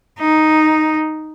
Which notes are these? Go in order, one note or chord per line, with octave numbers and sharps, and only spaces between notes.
D#4